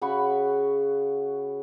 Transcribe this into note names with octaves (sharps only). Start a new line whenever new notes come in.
C#3 F#4 B5 C#6